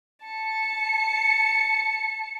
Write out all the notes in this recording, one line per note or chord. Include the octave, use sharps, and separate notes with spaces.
A5 C#7